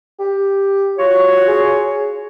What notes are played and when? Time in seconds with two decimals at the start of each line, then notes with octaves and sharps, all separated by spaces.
0.19 G4
0.99 F4 F#4 C#5
1.48 G#4